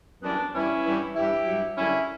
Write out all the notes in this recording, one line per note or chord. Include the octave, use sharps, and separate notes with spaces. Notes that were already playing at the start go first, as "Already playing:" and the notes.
F#2 E3 G3 B3 D4
G2 E3 G3 C#4 E4
G2 E3 G3
G2 E3 G3 E4 G4
G2 F#3
F#2 D3 G3 C#4 E4